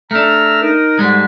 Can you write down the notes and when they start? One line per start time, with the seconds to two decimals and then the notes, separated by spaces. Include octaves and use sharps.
0.11 A3 D4 A#5 E6 F6
0.61 D#4 A#4
0.99 G#2 D3 G3 G#3